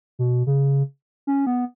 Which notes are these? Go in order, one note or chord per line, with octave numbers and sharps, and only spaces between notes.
B2
C#3
C#4
B3